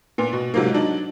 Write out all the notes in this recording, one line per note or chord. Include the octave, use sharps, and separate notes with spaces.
A#2 B3
B2
G#2 C3 F3 F#3 A#3
F#3 D4 D#4 F#7